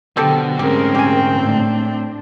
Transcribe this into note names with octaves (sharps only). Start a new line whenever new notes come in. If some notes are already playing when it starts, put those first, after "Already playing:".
B2 D3 F#3 C4 G4 A4
D2 G#2 C4 C#4 G4 G#4 A#4
G4 G#5
A2 D4